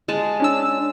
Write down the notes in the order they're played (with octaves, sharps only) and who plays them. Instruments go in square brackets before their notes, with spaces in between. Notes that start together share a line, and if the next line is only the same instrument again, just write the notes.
[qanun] G#3 A5
[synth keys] C#4 D4 E6